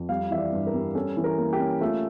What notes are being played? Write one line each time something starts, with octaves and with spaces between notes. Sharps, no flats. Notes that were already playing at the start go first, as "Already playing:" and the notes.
Already playing: F2
G3 F5
E3 E5
D5
G2
A#4
G3
C#4 A4
E3
A#4
A#3
G4
C#4
A3 F4